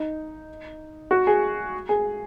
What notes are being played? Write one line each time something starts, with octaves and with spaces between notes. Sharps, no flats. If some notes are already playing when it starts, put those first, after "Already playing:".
Already playing: D#4
F#4
G#4
G#4